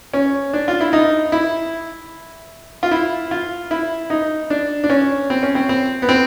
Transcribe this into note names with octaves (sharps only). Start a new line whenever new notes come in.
C#4
D4
F4
E4
D#4
E4
F4
E4
F4
E4
D#4
D4
D4
C#4
C4
C#4
C4
C4
B3
C4